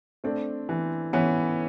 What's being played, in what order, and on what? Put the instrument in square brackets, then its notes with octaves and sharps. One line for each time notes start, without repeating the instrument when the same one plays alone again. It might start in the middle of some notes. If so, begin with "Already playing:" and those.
[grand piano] A3 [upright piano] C4 D4
[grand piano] E3
[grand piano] E3 [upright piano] B3 C#4